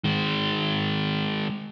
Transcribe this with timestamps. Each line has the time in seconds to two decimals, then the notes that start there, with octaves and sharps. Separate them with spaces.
0.04 D#3 G#3